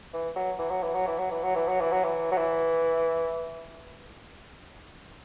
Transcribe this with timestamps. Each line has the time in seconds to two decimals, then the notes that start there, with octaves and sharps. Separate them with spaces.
0.13 E3
0.36 F#3
0.59 E3
0.70 F#3
0.83 E3
0.94 F#3
1.07 E3
1.19 F#3
1.31 E3
1.43 F#3
1.55 E3
1.68 F#3
1.80 E3
1.92 F#3
2.04 E3
2.32 F#3
2.37 E3